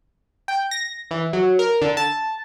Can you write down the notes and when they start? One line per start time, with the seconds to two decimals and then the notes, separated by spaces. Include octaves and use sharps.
0.48 G5
0.71 A#6
1.11 E3
1.33 F#3
1.59 A#4
1.82 D3
1.97 A5